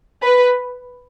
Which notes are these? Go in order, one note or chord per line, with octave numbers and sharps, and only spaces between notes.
B4